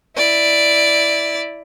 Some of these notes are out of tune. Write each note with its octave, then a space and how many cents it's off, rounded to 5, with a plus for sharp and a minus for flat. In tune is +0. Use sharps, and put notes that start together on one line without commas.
E4 +0 D5 +0